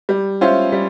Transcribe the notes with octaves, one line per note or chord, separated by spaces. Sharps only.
G3
C#4 F4 C5 E5
G3